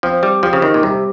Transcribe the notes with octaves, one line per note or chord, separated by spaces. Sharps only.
F3 C4
G3
F3 G4
C#3
D#3
A#2
C3 G3